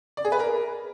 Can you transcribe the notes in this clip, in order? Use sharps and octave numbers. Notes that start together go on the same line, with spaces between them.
D5
G#4
B4
A#4